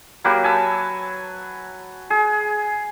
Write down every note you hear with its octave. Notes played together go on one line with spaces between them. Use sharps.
F#3 A#3 G4 B4
G#5 A5 E6
G#4